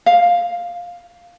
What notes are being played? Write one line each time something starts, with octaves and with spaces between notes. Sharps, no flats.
F5